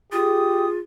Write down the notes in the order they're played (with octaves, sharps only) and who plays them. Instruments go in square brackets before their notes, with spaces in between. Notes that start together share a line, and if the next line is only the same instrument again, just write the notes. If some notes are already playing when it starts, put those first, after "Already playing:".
[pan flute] F4 [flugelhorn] G4 [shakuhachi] G#4 [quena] D#6